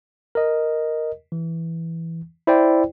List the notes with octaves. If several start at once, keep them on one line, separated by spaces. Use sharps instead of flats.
A#4 D#5
E3
E4 C5 D5 G5